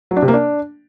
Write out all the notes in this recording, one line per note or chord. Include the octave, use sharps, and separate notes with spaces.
F#3
D4
C3
A#3
D4